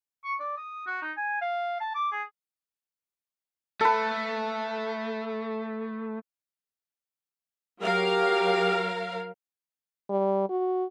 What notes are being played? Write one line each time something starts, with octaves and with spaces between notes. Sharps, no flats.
C#6
D5
D#6
F#4
D#4
G#5
F5
A5
D6
G#4
A3 A4 B4
F#3 G4 A#4 F5
G3
F#4